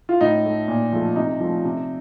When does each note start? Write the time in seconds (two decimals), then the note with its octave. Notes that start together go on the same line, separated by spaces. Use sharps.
0.09 F4
0.21 A2 D#4
0.45 A3
0.68 A#2
0.92 F3 A3
1.16 C3 D#4
1.40 F3 A3
1.65 C3